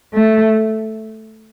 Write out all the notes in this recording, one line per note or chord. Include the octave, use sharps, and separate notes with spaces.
A3